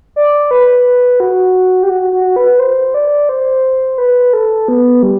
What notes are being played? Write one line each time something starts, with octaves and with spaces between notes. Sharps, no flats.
D5
B4
F#4
G4
F#4
F#4
B4
C5
D5
C5
B4
A4
B3
G3